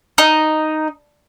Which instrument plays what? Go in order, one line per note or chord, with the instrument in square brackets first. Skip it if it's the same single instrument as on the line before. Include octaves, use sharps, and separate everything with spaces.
[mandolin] D#4